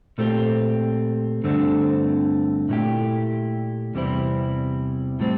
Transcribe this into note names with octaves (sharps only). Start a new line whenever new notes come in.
A#2 A3 C4 G4
G2 D3 A3 C4
A#2 A3 E4 G4
E2 C3 G3 C4 E4
A2 G3 C4